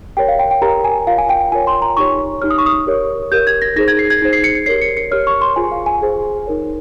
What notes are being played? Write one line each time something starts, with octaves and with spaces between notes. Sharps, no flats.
G4 A#4 C#5 G5
F5
G5
G5
G4 A#4 C#5 A#5
G#5
F4 A#4 C#5 F5
G#5
G5
G5
F4 A#4 C#5 G#5
C6
A#5
D#4 G4 C#5 C#6
D#4 G4 C#5 F6
D#6
C#6
D#6
G4 A#4 C#5
G4 A#4 C#5 G6
G#6
A#6
D#4 G#4 C5 A#6
G#6
C7
G#6
D#4 G#4 C5 G#6
C7
C#7
C#7
G4 A#4 C#5 C7
C#7
C#7
G4 A#4 C#5 F6
C#6
C6
F4 G#4 C5 G#5
F5
G#5
F4 G#4 C5
D#4 A#4 C#5